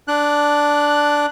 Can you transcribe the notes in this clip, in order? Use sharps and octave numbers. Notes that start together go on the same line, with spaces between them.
D4 F#6